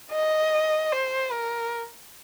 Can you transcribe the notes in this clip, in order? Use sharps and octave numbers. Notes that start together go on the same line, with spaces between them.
D#5
C5
A#4